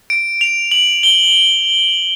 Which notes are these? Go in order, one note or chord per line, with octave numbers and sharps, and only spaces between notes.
D7
F7
F#7
G7